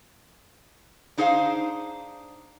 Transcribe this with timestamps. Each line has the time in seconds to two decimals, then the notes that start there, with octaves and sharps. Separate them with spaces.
1.18 D4 D#4 G#4 C5 D#5 F5